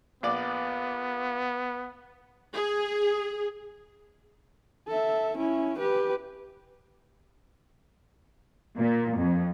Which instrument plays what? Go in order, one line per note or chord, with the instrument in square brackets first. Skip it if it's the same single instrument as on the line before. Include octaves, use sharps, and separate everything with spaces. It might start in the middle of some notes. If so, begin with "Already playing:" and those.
[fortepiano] A#1 D5 [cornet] B3
[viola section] G#4
[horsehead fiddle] A4 E5
C#4 E4
G4 B4
[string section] A#2
F2